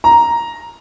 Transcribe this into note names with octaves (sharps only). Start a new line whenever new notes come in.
A#5